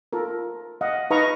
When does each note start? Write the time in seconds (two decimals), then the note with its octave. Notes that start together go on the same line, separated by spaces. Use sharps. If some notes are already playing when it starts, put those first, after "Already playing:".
0.13 F4 A4 A#4
0.81 D#5 F5 F#5
1.10 D#4 B4 D#5 F5 A#5 C#6